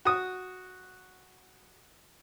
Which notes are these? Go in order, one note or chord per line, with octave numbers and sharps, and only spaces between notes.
F#4 D#6